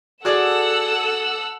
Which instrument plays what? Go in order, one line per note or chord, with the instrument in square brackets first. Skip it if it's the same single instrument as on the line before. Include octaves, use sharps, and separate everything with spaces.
[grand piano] F#4 G#4 D5 [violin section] A4 F#5 E6